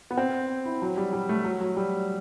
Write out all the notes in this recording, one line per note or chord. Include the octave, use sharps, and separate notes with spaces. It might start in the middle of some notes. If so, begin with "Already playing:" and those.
B3
C4
E4
F#3
G3
G3
A3
F#3
F#3
G3